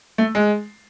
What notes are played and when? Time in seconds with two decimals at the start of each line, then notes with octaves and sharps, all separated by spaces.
0.18 A3
0.35 G#3